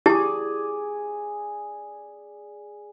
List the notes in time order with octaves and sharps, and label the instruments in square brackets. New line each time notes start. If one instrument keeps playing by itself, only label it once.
[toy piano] E4 G4 A5 [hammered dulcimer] G#4 D5